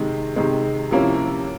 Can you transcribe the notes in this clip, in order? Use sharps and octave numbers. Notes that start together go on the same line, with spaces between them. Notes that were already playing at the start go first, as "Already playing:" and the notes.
Already playing: C3 D#3 G#3
C3 D#3 G#3
C3 F3 A#3 C#4 E4